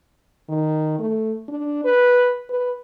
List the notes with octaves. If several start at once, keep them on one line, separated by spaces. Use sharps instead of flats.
D#3
A3
D4
B4
B4